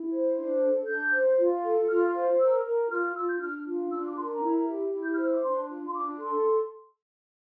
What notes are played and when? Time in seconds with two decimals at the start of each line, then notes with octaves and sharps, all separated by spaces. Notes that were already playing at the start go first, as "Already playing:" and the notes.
Already playing: E4
0.12 C5
0.37 D4
0.62 A4
0.87 D4 G6
1.12 C5
1.38 F4
1.63 A4
1.88 F4 F6
2.14 C5
2.39 A#4 E6
2.64 A#4
2.90 F4 F6
3.02 F6
3.15 F4 E6
3.27 G6
3.40 D4 F6
3.66 F4
3.91 D4 E6
4.04 D6
4.17 A#4 C6
4.30 A#5
4.42 E4
4.67 G4
4.92 E4
5.03 G6
5.13 C5 F6
5.24 E6
5.33 D6
5.43 D4 C6
5.69 F4
5.87 C6
5.93 D4 D6
6.19 A4 C6